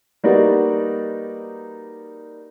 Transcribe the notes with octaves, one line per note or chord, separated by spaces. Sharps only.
G3 A#3 D#4 F#4 B4 D5